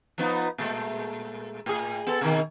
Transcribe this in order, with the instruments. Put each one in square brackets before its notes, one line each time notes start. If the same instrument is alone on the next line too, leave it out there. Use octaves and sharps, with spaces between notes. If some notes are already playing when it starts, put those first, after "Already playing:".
[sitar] F3 B3 D#4
A#2 G#3 A3
A2 G#4
B3 A4
B2 D#3